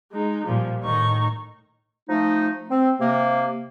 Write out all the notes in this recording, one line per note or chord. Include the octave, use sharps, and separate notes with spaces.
G#3 D#4
A#2 F3 G3
A2 D#3 D#4 C#6
F3 A3 D#4
C4
C3 A#3